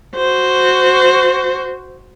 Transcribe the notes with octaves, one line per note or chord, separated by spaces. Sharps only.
F#4 C5